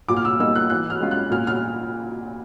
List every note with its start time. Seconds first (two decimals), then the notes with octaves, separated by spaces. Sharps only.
0.08 A#2 D6
0.16 F6
0.25 E6
0.39 G3 A#3 D#4 E6
0.55 F#6
0.70 E3 F#6
0.90 F6
1.00 G#3 C#4 F4
1.11 F#6
1.31 A#2 F6
1.47 F6